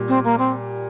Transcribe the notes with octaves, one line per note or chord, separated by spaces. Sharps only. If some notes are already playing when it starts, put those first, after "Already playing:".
Already playing: A#2 G3
C4
A#3
C4